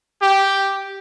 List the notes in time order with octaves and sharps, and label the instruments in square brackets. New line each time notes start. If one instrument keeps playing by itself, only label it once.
[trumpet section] G4